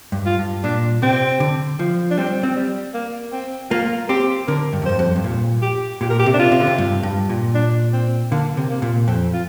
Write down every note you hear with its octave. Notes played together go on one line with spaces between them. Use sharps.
G2
F4
G2
A#2 D4
C3 C4
D3
F3
D4
G3 C4
C4
G3
A#3
C4
A#3 F4
C4 G4
D3 A#4
G2
F2
G2 C5
F2
G2
A#2
G4
A#2 G4
A#4
G4
C3
D4
F4
C3
D3
C3
G2
G2
A#2
D4
C4
D3 A#3
C3
A#3
A#2
F2 C4
F4